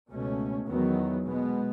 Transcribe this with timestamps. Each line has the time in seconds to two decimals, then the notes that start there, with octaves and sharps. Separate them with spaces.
0.10 C#2 B2 A3 C#4
0.67 E2 D#3 F#3 B3
1.25 B2 G#3 B3